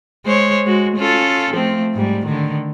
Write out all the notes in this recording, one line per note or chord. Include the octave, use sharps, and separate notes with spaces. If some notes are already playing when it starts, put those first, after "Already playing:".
G#3 C5 C#5
G#3 F#4
C#4 F4 A4
F3 A3 C4
G#2 G3
D3 D#3